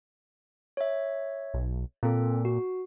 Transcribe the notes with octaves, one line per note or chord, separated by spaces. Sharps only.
C#5 E5
B1
A#2 C4 A4
F#4